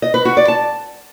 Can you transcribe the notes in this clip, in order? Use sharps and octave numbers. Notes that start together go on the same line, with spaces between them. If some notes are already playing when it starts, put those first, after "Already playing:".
D#5
B4
F#4
D5
A5